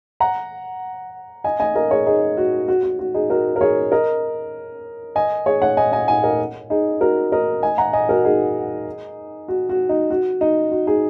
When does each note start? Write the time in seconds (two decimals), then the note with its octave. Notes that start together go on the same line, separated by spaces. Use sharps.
0.20 F#5 A#5
1.44 D#5 G#5
1.60 D#5 G#5
1.75 A#4 D#5
1.91 G#4 C#5
2.07 D#4 G#4
2.37 F#4
2.68 F#4
2.83 F#4
2.99 F#4
3.14 D#4 G#4
3.30 F#4 A#4
3.56 A#4
3.61 G#4 C#5
3.92 A#4 D#5
5.16 D#5 G#5
5.46 G#4 C#5
5.61 C#5 F#5
5.77 D#5 G#5
5.93 D#5 G#5
6.08 D#5 G#5
6.23 A#4 D#5
6.70 D#4 G#4
7.01 F#4 A#4
7.32 A#4 D#5
7.63 D#5 G#5
7.78 F#5 A#5
7.93 D#5 G#5
8.09 F#4 A#4
8.24 D#4 G#4
9.48 F#4
9.69 F#4
9.89 D#4
10.10 F#4
10.41 D#4
10.72 F#4
10.87 D#4 G#4